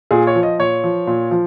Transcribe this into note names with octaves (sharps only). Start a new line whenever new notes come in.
A#2 G#4
C#5
F3
D#5
A#2 C#5
F3
A#2
F3